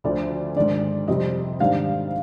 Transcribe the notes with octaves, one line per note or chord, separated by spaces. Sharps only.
D2 D3 F3 D5
G#2 D#3 G#3 D4 D5
F2 C3 G3 C4 D#5
G#2 D#3 G3 D4 F5